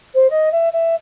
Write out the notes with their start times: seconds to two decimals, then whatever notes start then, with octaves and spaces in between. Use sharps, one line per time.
0.14 C5
0.29 D#5
0.51 E5
0.72 E5